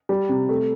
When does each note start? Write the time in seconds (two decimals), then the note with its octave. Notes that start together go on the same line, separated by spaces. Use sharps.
0.09 G3
0.29 C3
0.49 A3